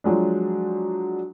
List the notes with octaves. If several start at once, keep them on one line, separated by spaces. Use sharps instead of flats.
F3 F#3 G#3 D4